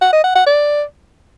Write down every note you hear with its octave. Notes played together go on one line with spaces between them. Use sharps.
F#5
D#5
F#5
F#5
D5